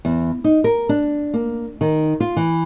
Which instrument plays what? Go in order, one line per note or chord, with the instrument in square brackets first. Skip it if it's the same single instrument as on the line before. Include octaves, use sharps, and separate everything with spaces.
[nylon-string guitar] E2
D#4
A#4
D4
A#3
D#3
F4
E3